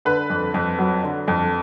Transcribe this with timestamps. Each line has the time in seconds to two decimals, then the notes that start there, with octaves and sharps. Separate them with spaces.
0.05 D3 B4
0.30 F2
0.54 F2
0.79 F#3
1.03 D3
1.28 F2